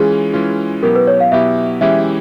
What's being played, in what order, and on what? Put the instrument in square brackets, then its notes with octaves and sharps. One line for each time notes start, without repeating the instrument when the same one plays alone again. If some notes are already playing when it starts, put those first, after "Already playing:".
Already playing: [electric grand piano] E3 G#3 C#4 F4 [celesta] G#4
[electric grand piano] E3 G#3 C#4 F4
[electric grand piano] B2 F#3 B3 E4 G4 [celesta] A#4
[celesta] B4
C#5
F5
[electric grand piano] B2 F#3 B3 E4 G4 [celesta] E5
[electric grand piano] E3 G#3 C#4 E4 G4 [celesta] E5